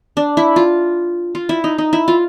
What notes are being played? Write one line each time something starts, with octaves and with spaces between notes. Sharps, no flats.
D4
E4
F4
F4
E4
D#4
D#4
E4
F4